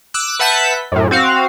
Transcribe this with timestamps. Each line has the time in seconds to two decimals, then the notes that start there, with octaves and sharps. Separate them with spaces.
0.14 D6 E6 F#6
0.39 B4 E5 F#5 A5 G6 B6
0.92 F#2 A2
1.11 C4 F#4 F5